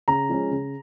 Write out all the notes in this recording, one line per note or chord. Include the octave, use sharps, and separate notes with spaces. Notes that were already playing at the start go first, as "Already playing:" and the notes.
C#3 A#5
F3 G#3 C#4
C#3